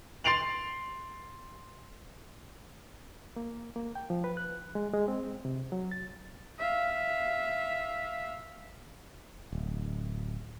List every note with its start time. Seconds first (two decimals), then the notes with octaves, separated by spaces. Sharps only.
0.24 C6 A6 C7 D7 F7 F#7
3.36 A#3
3.76 A#3
3.95 G5
4.10 F3
4.24 B4
4.37 F#6
4.75 G#3
4.94 G#3
5.08 C4
5.45 C3
5.72 F#3
5.91 A6
6.59 E5 F5
9.53 D1